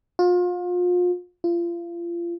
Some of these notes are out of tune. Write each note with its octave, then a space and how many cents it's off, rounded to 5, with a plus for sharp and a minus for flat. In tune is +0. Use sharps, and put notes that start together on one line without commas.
F4 +35
F4 -30